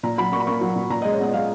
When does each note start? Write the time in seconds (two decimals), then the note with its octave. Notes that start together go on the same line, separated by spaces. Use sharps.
0.03 A#2 A#5
0.18 F#3 B5
0.32 A#3 C#6
0.40 B5
0.47 A#3 C#6
0.61 F#3
0.76 A#2
0.90 A#2 A#5
1.02 D#5
1.05 G#3
1.13 C#5
1.20 B3 D#5
1.34 G#3 F5